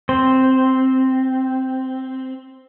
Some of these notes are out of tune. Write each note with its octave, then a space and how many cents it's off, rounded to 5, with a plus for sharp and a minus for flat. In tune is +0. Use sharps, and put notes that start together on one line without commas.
C4 +0 C5 +0